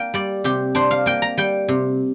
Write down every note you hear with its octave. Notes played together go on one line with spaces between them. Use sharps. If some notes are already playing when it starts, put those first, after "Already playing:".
Already playing: A#3 D4 F5 G5
G3 D5
C3 G4
D4 C5
F5
A#3 G5
A#5
G3 G5
C3